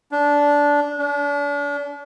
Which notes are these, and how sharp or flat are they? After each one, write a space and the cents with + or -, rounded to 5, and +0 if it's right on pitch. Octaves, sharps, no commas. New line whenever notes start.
D4 -15
D4 -40